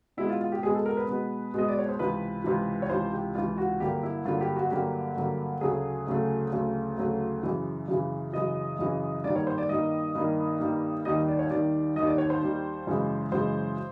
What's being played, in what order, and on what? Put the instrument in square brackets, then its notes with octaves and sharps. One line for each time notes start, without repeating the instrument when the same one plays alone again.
[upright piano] B2 G#3 B3 E4
F4
F4
G4
B2 G#3 B3 G#4
A4
A#4
B4
B2 G#3 B3
B2 G#3 B3 D#5
D5
C#5
C5
C#2 C3 E3 B4
C#2 C3 E3
C#5
C#2 C3 E3 C5
G4
C#2 C3 E3 F4
F#4
G2 D3 F#3 A#3 G4
E4
G2 D3 F#3 A#3 F4
G4
F#4
G2 D3 F#3 A#3 G4
G2 D3 F#3 A#3
D2 C#3 F#3 A3 G#4
D2 C#3 F#3 A3
D2 C#3 F#3 A3
D2 C#3 F#3 A3
F#2 C#3 E3
F#2 C#3 E3
F#2 C#3 E3 D#5
F#2 C#3 E3
G2 D#3 G3 A#3 D5
C#5
C5
D5
G2 D#3 G3 A#3 D#5
G2 D#3 G3 A#3
G2 D#3 G3 A#3
D#2 D#3 G3 D#5
D5
C#5
D#2 D#3 G3 D5
D#2 D#3 G3 D#5
D5
C#5
C5
D#2 D#3 G3
F#2 C#3 E3 G#3
F#2 C#3 E3 G#3 C5